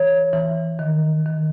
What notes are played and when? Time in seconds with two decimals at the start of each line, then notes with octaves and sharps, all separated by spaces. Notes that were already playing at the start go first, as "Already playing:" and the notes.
Already playing: E3 C#5
0.33 E3
0.79 D#3
1.26 D#3